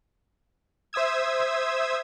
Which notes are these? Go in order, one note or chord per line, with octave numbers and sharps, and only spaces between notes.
C5 E5 D#6 E6 G#6